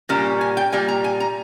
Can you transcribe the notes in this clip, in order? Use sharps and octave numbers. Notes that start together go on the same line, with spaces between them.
A#2 G3 A#3 C#4
G#5
G5
A#2 G3 A#3 G#5
A#5
G#5
A#5